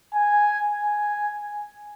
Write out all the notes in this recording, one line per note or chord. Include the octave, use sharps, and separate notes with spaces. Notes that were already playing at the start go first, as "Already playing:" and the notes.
G#5
G#5